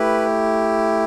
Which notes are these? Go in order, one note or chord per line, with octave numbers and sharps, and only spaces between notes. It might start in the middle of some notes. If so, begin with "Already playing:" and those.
Already playing: A3 E4 G4 B4